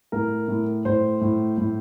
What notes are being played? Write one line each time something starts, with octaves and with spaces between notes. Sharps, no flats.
A2 A#4
A2
A2 C5
A2
A2